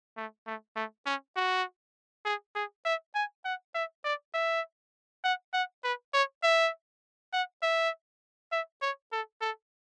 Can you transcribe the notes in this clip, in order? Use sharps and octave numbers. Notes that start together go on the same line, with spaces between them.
A3
A3
A3
C#4
F#4
G#4
G#4
E5
G#5
F#5
E5
D5
E5
F#5
F#5
B4
C#5
E5
F#5
E5
E5
C#5
A4
A4